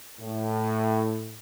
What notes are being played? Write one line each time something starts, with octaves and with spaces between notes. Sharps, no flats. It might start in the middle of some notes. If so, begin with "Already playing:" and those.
A2